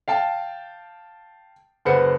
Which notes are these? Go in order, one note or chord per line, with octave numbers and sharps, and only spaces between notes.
F5 G5 A5
F#1 B4 C5 F#5 C#7